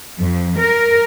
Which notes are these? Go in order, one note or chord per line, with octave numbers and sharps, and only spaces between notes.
F2
A#4